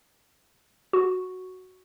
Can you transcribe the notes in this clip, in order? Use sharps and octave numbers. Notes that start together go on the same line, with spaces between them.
F#4